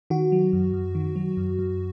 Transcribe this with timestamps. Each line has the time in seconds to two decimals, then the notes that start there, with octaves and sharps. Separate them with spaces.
0.10 D#3 F#4
0.32 F#3
0.53 F#2
0.73 F#2
0.95 D#3
1.16 F#3
1.37 F#2
1.59 F#2